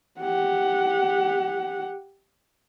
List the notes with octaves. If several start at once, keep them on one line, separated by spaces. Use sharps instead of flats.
G4 F#5